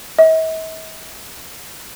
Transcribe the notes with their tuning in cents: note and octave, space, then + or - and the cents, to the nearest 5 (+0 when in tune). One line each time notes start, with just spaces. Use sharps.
E5 -45